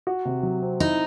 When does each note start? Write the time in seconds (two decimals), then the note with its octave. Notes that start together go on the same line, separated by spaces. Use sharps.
0.07 F#4
0.25 C3
0.43 F#3
0.62 C4
0.80 D#4 E4